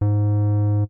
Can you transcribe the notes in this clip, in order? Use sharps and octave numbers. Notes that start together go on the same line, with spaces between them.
G#2